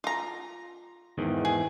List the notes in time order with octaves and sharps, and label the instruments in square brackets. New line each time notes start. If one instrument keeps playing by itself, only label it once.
[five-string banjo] F4 A#5
[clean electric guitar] E2 G#2 D#3
[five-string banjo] G#4